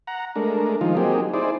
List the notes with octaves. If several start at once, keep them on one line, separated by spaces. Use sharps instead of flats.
F#5 A#5
G#3 A3 D4 A#4
D#3 F3 G#3 D#4 F4
F#3 A#3 C4 D#4 G4 G#4
D#4 E4 G#4 C5 D5